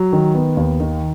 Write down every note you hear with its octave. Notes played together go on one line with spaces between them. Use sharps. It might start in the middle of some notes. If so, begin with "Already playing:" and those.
Already playing: F#3
D#3
B3
D#2
D#3